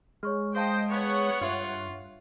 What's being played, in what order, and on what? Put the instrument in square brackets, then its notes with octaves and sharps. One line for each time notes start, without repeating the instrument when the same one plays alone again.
[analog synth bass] G#3 [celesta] C#5 C#6 F6
[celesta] G#4 F5 A5 [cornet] C5 [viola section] D#5 G5
[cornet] B3 [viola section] C#5 F#5
[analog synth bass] G2 [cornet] F4 [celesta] E5 C#6